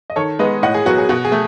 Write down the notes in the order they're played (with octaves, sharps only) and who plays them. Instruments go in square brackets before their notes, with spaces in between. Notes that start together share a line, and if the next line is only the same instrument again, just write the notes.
[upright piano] D#5
D#3 A4 C#5
G#3 B3 B4 D#5
A2 D#5 F#5
G#4
F#3 B3 F#4
G#4
B2 F#4
G#4
A3